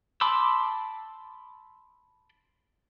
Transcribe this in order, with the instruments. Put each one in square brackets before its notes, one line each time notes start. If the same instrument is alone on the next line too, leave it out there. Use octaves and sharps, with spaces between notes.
[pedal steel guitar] A5 B5 C6 D6 E6